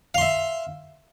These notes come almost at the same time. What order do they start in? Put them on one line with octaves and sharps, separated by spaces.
F5 C6 E5